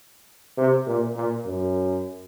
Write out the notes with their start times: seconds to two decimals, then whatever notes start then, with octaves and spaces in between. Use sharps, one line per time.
0.57 C3
0.87 A#2
1.16 A#2
1.45 F#2